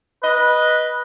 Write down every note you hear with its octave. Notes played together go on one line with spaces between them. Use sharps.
B4 D#5